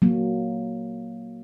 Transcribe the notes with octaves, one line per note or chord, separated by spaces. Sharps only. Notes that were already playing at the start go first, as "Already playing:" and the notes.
F#3 A#3